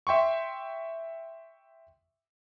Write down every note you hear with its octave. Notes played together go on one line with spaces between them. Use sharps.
E5 G5 C6 C#6